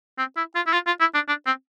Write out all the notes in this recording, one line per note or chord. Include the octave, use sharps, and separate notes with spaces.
C4
E4
F4
E4
F4
F4
E4
D4
D4
C4